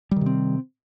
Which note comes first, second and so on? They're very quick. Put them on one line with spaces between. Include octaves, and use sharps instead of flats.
G3 D#3 C3 C4